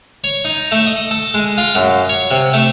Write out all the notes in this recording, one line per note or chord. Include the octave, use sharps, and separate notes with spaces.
C#5
D#4
A3
D#5
A4
G#3
F4
F#2
C#5
C3
A3